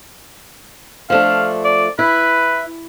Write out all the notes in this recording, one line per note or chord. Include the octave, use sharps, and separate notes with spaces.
F3 A3 D4 F5
D5
E4 B4